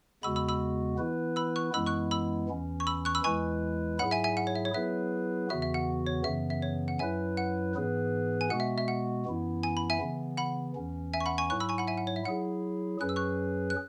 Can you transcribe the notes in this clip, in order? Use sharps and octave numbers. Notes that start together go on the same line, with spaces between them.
E2 C#3 G#3 B3 F#4 B5 E6
B5 E6
B5 E6
E3 B3 E4 B4
B5 E6
C#6 F#6
F#2 E3 G#3 B3 E4 B5 E6
C#6 F#6
B5 E6
E2 E3 C#4
C#6
B5 E6
C#6 F#6
B5 E6
E2 E3 G#3 E4 B4 G#5 C#6
G#2 F#3 E4 G#4 F#5 B5
E5 G#5
E5 G#5
F#5
C#5
E5
C#5
F#3 B3 E4 G#4 B4 E5
E2 C#3 E3 B3 F#4 E5
E5
F#5
C#5
F#2 C#3 E3 B3 E5
E5
C#5
F#5
F#2 F#3 E4 B4 E5 G#5
F#5
G#2 E3 B3 G#4 B4
G#5
B2 G#3 B3 F#4 F#5
E5
E5
F#5
F#2 E3 B3 E4
G#5
B5
E5 G#5
C#3 E3 B3
F#5 B5
E2 E3 C#4
E5 G#5
C#6
F#5 B5
G#5 C#6
G#2 F#3 E4 C#6 F#6
B5 E6
G#5 C#6
F#5 B5
E5 G#5
F#5
C#5
E5
F#3 E4 G#4 F#5
F#2 F#3 C#4 G#4 B4 F#6
E6
C#6 F#6
F#6